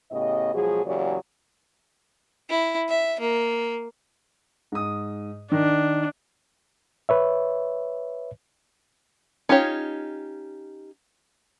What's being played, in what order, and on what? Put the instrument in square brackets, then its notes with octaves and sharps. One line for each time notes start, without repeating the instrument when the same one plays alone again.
[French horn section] A2 C#3 B3 G4 D#5
B2 F3 F#3 G#3 G#4
E2 C#3 F#3 A#3 G4 D5
[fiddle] E4
E5
A#3
[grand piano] G#2 D#6
[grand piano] D#3 [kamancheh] D4
[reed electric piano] B4 C#5 E5
[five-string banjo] C#4 D#4 F4 G4 C#5